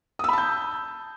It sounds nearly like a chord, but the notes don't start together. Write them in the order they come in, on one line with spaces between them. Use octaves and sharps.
D#6 E6 B5 A5 G6